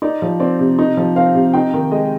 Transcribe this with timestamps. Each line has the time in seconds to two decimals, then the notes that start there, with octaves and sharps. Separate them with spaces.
0.02 D#4 D5
0.22 F3
0.40 C4 D5
0.59 C3
0.79 D#4
0.97 F3
1.16 C4 F5
1.35 C3
1.53 D#4 G5
1.74 D#3
1.91 G#3 D#5